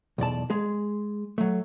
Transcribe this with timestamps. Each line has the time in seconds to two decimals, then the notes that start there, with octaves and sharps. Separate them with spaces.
0.18 B1 E2 D5 A5
0.50 G#3 G#4
1.38 F#3 A3